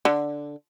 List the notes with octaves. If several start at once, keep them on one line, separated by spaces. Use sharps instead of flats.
D3